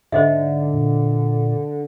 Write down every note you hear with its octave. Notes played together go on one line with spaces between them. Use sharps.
G#2 D3 C5 D#5 E5
A#2